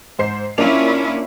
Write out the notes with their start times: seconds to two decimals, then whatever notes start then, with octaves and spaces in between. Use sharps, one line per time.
0.19 G#2 C5 C7
0.58 A#3 C#4 D4 E4 F4 F7